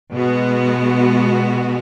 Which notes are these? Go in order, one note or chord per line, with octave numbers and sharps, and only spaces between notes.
B2 G#3 B3 F#4